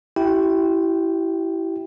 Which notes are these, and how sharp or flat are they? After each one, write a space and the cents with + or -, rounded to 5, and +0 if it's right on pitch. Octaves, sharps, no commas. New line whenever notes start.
E4 +0 G4 -35 G5 +0